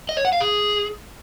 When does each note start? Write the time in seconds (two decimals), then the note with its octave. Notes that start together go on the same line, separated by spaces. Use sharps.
0.09 D#5
0.17 C#5
0.25 F#5
0.33 F5
0.41 G#4